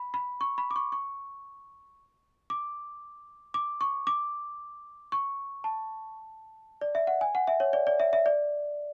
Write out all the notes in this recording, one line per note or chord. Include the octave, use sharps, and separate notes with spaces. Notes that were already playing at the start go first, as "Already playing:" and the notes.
Already playing: B5
B5
C#6
B5
D6
C#6
C#6
D6
D6
C#6
D6
C#6
A5
D5
E5
F#5
G#5
F#5
E5
C#5
D5
D5
E5
E5
D5